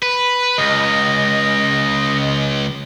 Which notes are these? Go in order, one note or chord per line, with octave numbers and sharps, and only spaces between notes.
B4
C#2 D#5